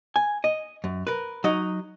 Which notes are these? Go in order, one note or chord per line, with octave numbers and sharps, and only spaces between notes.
G#5
D#5
F#2
A#4 B4
F#3 D#4 D#5